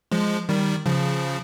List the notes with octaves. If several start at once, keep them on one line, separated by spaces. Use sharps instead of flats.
F3 G#3
D#3 G3
C#3 F3